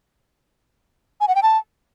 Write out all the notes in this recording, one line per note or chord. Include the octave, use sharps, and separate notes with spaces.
G#5
F#5
G5
A5